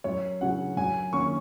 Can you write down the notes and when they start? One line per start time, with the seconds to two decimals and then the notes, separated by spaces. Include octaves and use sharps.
0.04 F#2 C#5
0.41 C#3 F#3 C#4 F#5
0.77 F#2 G#5
1.13 D#3 A#3 C#4 C#6